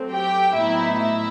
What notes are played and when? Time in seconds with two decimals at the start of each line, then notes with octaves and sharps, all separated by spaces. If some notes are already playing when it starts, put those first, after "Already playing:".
Already playing: F#3 A3 C4
0.11 G4 G5
0.54 A2 F#3 B3 D#4 E4 E5
0.98 E4 E5